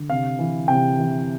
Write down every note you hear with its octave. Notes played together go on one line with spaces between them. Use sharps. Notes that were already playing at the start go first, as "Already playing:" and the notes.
Already playing: D3
C3 F5
E3
C3 G5
E3